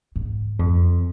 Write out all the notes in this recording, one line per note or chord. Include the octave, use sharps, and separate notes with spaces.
G#2
F2